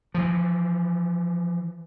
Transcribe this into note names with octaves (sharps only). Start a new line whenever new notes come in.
E3 F3